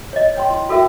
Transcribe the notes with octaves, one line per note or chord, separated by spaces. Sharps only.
C#5 D#5
C#5 G5 C6
E4 C6
F#4 A4 A#4 E5 G5